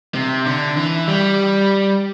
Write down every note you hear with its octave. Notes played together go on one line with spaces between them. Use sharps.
C3
D3
E3
G3